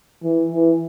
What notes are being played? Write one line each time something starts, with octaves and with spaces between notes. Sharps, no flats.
E3
E3